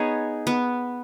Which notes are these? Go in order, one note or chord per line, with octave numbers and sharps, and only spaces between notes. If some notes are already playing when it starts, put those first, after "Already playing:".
Already playing: B3 D#4 G#4 C#5
B3